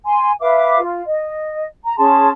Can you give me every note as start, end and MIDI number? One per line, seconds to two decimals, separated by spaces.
0.05 0.31 80
0.05 0.31 84
0.40 0.78 71
0.40 0.78 76
0.40 0.78 77
0.40 0.78 86
0.79 1.00 65
1.06 1.64 75
1.84 1.96 82
1.97 2.29 61
1.97 2.29 68
1.97 2.29 81
1.97 2.29 84